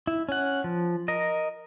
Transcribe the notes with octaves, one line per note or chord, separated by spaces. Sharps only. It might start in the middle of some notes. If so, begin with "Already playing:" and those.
E4
C#4 F#5
F3
A#4 D#5